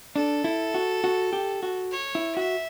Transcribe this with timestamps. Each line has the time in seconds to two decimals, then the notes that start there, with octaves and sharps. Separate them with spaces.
0.15 D4 A4
0.44 E4
0.74 F#4
1.04 F#4
1.33 G4
1.63 F#4
1.92 C#5
2.15 E4
2.36 F#4 E5